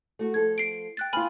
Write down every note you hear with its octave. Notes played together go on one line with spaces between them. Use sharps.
A3 F#4
F3 A4 G#6
C7 D7
G5 F#6 A6
B3 E4 F4 G#5 B5 F6